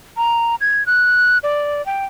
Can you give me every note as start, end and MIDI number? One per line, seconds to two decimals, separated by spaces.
0.17 0.55 82
0.61 0.85 92
0.86 1.38 90
1.43 1.85 74
1.86 2.05 79